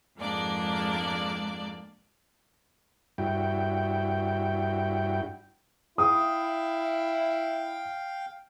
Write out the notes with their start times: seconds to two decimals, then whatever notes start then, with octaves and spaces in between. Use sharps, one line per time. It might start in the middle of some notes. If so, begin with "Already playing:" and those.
0.18 F2 G#2 G#3 A#3 D4 D5
3.18 G2 E4 F#4 G5
5.98 E4 F5 G5 D#6